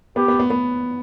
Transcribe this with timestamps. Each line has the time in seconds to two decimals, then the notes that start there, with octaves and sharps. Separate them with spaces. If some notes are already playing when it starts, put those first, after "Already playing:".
0.16 B3 G4
0.28 B3
0.40 B3
0.50 B3